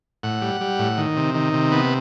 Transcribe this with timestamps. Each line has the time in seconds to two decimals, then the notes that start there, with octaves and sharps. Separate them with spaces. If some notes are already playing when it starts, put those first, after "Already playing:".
0.23 A2 F#5
0.41 G3
0.61 G3
0.79 A2
0.97 D#3
1.17 C3
1.34 D#3
1.53 C3
1.72 B3